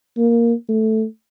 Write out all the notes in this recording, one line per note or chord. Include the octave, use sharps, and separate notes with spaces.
A#3
A3